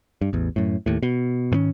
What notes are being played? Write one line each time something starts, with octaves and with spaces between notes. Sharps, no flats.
G2
A1 E2
F#2 A2
D#2 A2
B2
G#2 D#3 C4 C#4